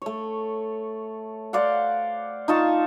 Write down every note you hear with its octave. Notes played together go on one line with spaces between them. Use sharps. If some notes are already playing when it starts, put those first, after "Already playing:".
A3 C#5
C5 D5 F5 F#5
D#4 F4 A5 C#6